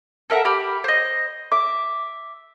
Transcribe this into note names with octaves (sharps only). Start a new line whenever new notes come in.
A4 A#4 E5 F#5
G4 B5 F6
C5 D#5
E5 D6